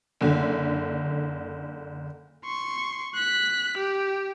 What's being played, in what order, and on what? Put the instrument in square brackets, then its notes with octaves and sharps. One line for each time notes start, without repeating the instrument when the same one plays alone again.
[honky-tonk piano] F#1 D3
[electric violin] C6 C#6
F#6 B6
G4